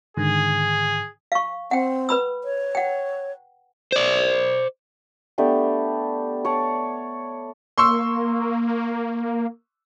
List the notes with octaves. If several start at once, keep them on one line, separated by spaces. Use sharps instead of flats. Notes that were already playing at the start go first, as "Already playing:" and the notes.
G#2 D3 D#3 G#4
F5 C#6
C4 F#5 G5
B4 B5 E6
C#5
F#5 G5
C5 D5
A3 B3 D4 G4
C#5 D5 F#5 A5
A#3 C6 C#6 E6